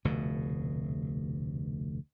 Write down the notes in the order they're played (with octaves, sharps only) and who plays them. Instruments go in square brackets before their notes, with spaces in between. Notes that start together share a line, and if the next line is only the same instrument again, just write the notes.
[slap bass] F1 D2 B2